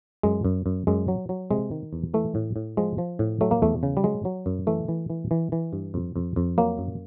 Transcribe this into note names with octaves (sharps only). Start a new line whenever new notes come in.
F#2 G#3
F#2
F#2
F#2 G#3
F#3
F#3
C3 G#3
D#3
E2
E3 A3
A2
A2
F3 G#3
F3
A2
F#3 A3
A#3
E2 A3
C#3
G3
F#3 G#3
F#3
F#2
E3 A3
E3
E3
E3
E3
G2
F2
F2
F2
F#3 A#3
F#2